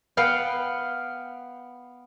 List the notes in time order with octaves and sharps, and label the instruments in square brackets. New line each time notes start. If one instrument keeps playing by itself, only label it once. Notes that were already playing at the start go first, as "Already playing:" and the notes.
[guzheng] B3 F5 G5